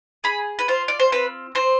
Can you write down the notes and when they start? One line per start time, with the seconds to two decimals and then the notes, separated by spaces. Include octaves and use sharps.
0.24 G#4 B5
0.59 B4
0.68 F4 C5
0.88 D5
1.00 C5
1.12 C4 B4
1.55 C4 C5